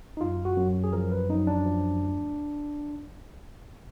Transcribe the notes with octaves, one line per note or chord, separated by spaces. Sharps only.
D#4
F#2 F4
F#4
F#2
G#4
F3 A#4
B4
F#2 D#4
D4
F3
D2